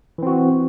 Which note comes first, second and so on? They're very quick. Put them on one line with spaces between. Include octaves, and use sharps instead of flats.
E3 C4 F#4